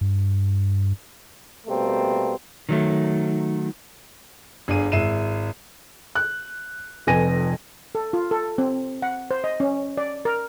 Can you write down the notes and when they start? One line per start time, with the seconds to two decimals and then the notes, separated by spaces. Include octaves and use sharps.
0.01 G2
1.66 B2 G3 A3 A#3 C4
2.69 D#3 F#3 A3
4.68 G1 D4 G#4 D#7
4.92 G#1 G#3 E4 C7 D#7 E7
6.15 F#6
7.07 F1 F2 B4 G#5 A#6 D#7
7.95 A4
8.13 F4
8.31 A4
8.58 C4
9.02 F#5
9.31 C5
9.44 D#5
9.60 C#4
9.97 D5
10.25 A#4